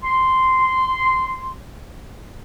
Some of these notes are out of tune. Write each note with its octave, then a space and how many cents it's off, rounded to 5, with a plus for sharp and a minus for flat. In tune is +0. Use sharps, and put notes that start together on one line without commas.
C6 -10